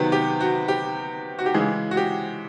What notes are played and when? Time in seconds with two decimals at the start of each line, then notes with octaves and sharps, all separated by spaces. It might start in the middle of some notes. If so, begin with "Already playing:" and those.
Already playing: C3 D#3 F#3 B3 B4
0.12 G4
0.40 F#4
0.68 G4
1.39 F#4
1.46 G4
1.54 C#3 E3 G#3 G#4
1.91 F#4
1.97 G4